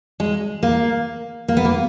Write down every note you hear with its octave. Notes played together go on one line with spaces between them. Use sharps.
G#3
A#3
A#3
B3
A#3